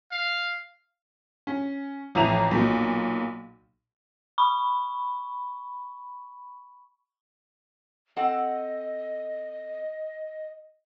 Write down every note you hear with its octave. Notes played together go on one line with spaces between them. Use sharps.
F5
C#4
A1 F2 E3 A#5 D#7 F7
B1 A#2
B5 C#6
C4 A4 D#5 F#5